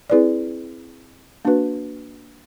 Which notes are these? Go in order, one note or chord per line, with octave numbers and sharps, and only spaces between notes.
C4 E4 G#4 B4 D5
A#3 D4 F#4 B4